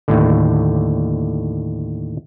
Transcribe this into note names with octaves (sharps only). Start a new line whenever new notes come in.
D#2 A2 D3